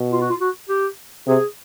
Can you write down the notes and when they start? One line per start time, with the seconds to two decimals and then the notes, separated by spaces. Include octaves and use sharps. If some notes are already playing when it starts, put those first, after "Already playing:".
Already playing: B2
0.12 F4
0.21 F#4
0.30 F4
0.41 F#4
0.69 G4
1.27 C3 G#4